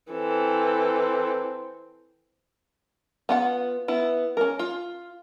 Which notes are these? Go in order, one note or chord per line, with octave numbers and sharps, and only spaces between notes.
E3 C4 A4
B3 F4 F#5
B3 E4
C#4 A#4
F4